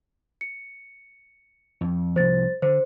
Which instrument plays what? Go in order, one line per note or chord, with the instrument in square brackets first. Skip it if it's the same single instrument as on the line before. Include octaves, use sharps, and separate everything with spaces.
[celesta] C#7
[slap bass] F2
[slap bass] C2 F3 [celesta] C5 A6
[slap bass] D3 [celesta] C5